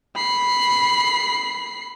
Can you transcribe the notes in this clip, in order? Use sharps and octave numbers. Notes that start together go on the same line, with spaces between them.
B5 C7